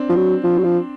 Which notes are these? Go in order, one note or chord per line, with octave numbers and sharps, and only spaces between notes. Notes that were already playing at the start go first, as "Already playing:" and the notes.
Already playing: C4 D4
F3
F#3
F3
F#3
F3